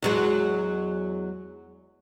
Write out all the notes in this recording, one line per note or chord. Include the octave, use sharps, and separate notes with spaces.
E2 F#3 G#3